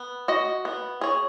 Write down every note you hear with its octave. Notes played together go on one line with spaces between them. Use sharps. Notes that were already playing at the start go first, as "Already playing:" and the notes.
Already playing: B3
F#4 D#5
B3
G#4 C#5